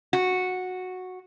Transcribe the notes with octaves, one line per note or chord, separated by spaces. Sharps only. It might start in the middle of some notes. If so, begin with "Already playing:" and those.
F#4